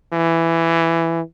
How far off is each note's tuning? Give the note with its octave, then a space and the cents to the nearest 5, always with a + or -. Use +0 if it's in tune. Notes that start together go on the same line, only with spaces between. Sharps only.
E3 +10